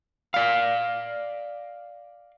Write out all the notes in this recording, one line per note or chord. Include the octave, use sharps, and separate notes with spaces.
D5 F5